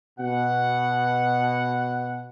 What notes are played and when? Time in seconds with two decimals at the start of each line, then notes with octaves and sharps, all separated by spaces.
0.19 B2 F#5